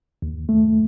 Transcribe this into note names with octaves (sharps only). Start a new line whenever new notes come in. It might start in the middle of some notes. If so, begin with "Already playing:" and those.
D#2
A3